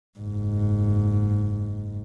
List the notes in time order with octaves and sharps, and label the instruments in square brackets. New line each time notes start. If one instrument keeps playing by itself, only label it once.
[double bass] F#1 G#2